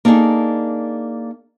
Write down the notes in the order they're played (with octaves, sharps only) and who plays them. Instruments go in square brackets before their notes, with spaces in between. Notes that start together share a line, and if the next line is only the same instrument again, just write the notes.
[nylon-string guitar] A#3 D4 D#4 G#4 A4